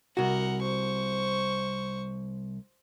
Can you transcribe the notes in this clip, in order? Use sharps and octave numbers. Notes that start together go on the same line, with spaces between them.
C2 F#4 A#4 F#5
C5 C#6